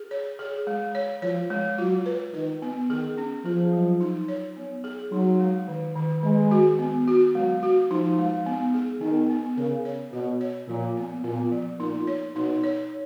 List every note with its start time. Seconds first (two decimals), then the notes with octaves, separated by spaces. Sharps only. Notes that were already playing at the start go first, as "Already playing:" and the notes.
Already playing: G#4
0.11 C#5
0.39 G#4
0.67 G#3
0.95 C#5
1.22 F3 C#5
1.50 G#3
1.78 F#3 F4
2.06 B4
2.34 D#3 B4
2.62 B3
2.90 D#3 G#4
3.18 C#4
3.45 F3 G#4
3.73 F#3
4.00 D#4
4.28 C#5
4.57 B3
4.84 G#4
5.12 F#3 D#4
5.40 G#3
5.68 D#3
5.96 D#3
6.23 D#3 G#3
6.51 F#4
6.79 B3
7.07 F#4
7.35 F#3 G#3
7.63 F#4
7.90 F3 D#4
8.18 G#3
8.46 B3
8.74 G#4
9.01 D#3 B3
9.30 B3
9.57 C#3 A#4
9.85 C#5
10.13 B2 F#4
10.41 C#5
10.68 A#2 F3
10.97 B3
11.24 A#2 B3
11.52 F3
11.80 A#2 D#4
12.07 C#5
12.35 B2 D#4
12.64 C#5